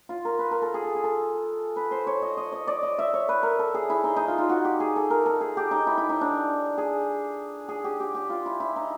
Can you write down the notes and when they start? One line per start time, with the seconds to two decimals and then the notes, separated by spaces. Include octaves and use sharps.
0.09 F4
0.25 A#4
0.39 B4
0.51 A#4
0.62 A4
0.74 G#4
0.85 A4
0.95 G#4
1.04 A4
1.76 B4
1.91 C5
2.07 C#5
2.22 D#5
2.37 D#5
2.52 D#5
2.67 D5
2.83 D#5
2.99 E5
3.14 C#5
3.29 B4
3.43 A#4
3.59 A4
3.75 G#4
3.90 E4
4.04 D#4
4.16 D#4
4.28 F4
4.38 F4
4.49 F#4
4.65 G4
4.80 G#4
4.96 A4
5.10 A#4
5.26 A4
5.41 G#4
5.57 G4
5.71 D#4
5.87 E4
5.98 E4
6.09 D#4
6.21 D4
6.78 G#4
7.69 G#4
7.84 G4
8.00 G4
8.15 G4
8.30 F4
8.46 E4
8.60 E4
8.76 D#4